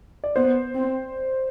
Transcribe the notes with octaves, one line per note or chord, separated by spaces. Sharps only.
D5
B3 C5
C4